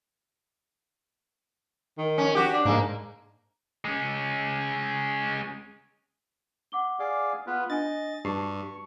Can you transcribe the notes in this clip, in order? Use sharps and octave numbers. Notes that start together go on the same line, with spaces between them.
D#3
C#4
F#4 G4
D4
G#2 A#3
G#3 C#4
F#5 D6 G7
G#4 D5 F5
B3 F4 B4
D4 D#5 G#5 A6
G2 F#4 A5 C#6 C7